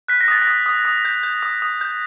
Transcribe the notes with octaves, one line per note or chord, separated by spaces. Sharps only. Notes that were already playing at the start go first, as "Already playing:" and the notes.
F#6 B6
A#6
D#6 A6
A#6
D#6
D#6
D#6
G6
G6
D#6
D#6
G6